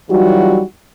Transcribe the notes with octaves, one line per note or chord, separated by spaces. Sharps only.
E3 F#3 G3 D#4 F4 F#4